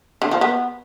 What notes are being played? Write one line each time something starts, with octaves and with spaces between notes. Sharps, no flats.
D3
F3
B3